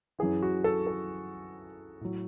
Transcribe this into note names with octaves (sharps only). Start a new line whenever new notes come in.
F#2 E3 G#4
F#4
A4
A4
A2 F#3